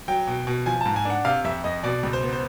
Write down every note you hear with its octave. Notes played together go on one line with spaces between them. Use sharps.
F#3 G5
B2
B2
F3 G#5
G#2 A5
G#5
D4 F#5
C3 F5
F2 E5
F2 D#5
B2 D5
C#2
C5
B3
C5